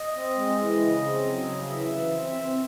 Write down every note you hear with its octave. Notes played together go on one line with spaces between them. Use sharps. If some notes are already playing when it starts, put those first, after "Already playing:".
Already playing: D#5
C4
G#3
E3
C#3
C4
F#3
C#3
D#5
E3 E5
E3
C4
C4